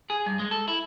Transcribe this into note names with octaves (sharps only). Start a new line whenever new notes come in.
G#4
G2
G#3
A4
E4